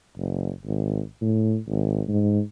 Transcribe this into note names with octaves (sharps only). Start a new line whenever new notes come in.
F#1
G#1
A2
G#1
G#2